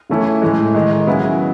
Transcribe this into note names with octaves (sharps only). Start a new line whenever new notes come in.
C#3 E3 A3 C#4 E4
A2 E3 G#3
D#3 G#3 D#4
C#3 F#3 B3 E4 G#4